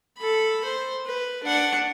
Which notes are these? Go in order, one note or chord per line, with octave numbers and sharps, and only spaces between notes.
A4 B5
C5
B4
D4 F#5